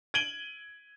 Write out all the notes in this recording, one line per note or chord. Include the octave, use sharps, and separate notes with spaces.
G#6 D7 D#7 F#7 G7